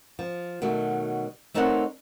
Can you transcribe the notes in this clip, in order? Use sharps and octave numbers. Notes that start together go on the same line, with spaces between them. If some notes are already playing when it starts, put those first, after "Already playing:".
F3
B2 D#3 F#3 A3
A3 C4 D#4 A#4 C#5 F#5